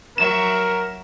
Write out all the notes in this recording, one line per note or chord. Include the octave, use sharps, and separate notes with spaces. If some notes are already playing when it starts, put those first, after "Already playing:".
F#3 F#4 A#4 E5 E7